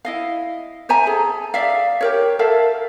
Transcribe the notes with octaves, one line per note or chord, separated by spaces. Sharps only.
E4 D#5 F5
C5 E5 G#5 A#5
G#4 A4
D5 E5 F5
G4 A#4 C#5
A4 A#4 E5 F5